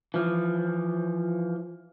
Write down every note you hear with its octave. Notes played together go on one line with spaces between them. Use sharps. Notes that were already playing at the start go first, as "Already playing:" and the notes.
E3 F3